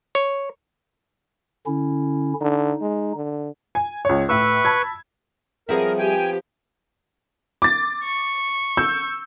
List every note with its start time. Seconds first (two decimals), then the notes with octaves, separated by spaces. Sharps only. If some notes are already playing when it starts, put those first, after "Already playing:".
0.15 C#5
1.66 D3 C#4 E4
2.41 D3 D#4
2.81 G#3
3.15 D3
3.75 G#5
4.05 C#2 C#5
4.29 A2 B4 C#6 E6
4.65 A5 B5 G#6
5.69 F3 G3 B3 C4 G#4 A#4 E5
5.98 G4 G5 G#5
7.62 D6 A6
8.04 C#6
8.77 E6 G6